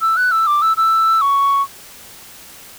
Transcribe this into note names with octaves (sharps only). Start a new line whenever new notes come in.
E6
F#6
E6
D6
E6
E6
C#6